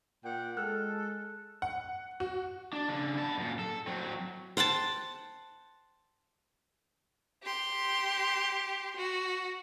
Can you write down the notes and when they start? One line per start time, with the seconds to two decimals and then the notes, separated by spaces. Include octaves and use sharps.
0.24 A#2 F#5 G5
0.57 G#3 A4 F6 F#6
1.62 F#5
2.20 F#4
2.73 D4
2.89 C#3 D4
3.17 B3 A5
3.38 F#2 A#2
3.59 A4
3.87 F#3 C4
4.57 C5 F#5 G5 A5
7.43 G4 C6
8.96 F#4